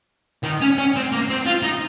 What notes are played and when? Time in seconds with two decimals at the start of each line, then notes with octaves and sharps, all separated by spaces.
0.44 D#3
0.61 C#4
0.78 C#4
0.96 C4
1.12 A#3
1.30 C4
1.46 F4
1.63 D#4